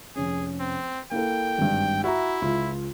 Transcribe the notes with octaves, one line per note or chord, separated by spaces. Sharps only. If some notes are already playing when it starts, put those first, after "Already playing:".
F1 C#4 G#4
C4
A#3 E4 A4 G5
G#1 G2
E4 F#4 E5 A#5
C#2 F4